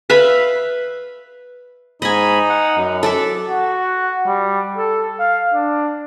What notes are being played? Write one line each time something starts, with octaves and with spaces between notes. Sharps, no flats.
B4 E5 F5 B5
G#2 D#4 D#5 G#5 B5
F#5
F#2
A4 D5 E5
F#4
G3
A4
F5
D4